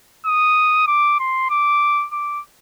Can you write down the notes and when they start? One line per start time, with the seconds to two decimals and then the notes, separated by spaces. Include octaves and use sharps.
0.26 D#6
0.87 D6
1.20 C6
1.50 D6
2.12 D6